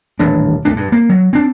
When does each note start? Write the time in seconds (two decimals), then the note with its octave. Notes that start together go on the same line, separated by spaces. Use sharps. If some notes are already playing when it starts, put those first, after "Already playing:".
0.19 D#1 A1 E3 D4
0.65 B1 A3 D4
0.76 G2
0.92 A#3
1.09 F#3
1.33 C4 D4